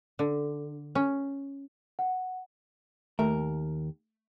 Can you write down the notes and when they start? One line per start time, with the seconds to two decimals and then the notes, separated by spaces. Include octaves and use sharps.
0.19 D3
0.95 C#4
1.99 F#5
3.19 D#2 A3 A#4